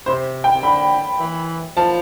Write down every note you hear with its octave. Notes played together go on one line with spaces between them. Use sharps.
C3 C5
G5
C3
D3 B5
E3
F3 A5